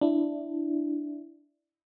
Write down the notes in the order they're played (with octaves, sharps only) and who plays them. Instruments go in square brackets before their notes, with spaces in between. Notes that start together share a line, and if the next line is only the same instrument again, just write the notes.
[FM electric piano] D4 E4